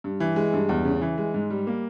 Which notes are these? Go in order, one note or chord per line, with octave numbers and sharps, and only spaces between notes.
G2
E3
G#3
G2
E2
C#3
E3
G#3
G#2
G3
A#3